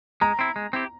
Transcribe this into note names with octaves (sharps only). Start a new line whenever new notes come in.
G#3 A#5
C4 E4
G#3
C4 E4 G4